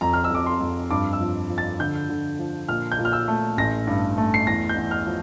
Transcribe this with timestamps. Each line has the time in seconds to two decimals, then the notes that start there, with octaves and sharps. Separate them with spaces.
0.01 F2 A#5
0.13 F6
0.24 E6
0.30 F2 D6
0.46 C6
0.60 F2
0.91 G2 D6
1.13 E6
1.20 F3
1.50 F3
1.58 A6
1.80 D3 G6
2.09 D3
2.39 F3
2.69 A#2 F6
2.92 G6
2.99 A#2
3.05 F6
3.13 E6
3.28 A3
3.57 A1 A#6
3.87 G2
4.18 A3
4.34 C7
4.47 E2 A#6
4.69 G6
4.77 E2
4.91 F6
5.06 F3